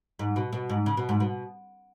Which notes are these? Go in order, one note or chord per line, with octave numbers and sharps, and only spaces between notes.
G#2
B2
B2
G#2
C#3
B2
G#2
B2